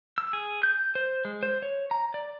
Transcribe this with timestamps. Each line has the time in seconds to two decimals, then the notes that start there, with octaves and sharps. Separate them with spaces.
0.18 E6
0.33 G#4
0.63 G6
0.95 C5
1.25 G#3
1.43 C5
1.62 C#5
1.91 A#5
2.14 D5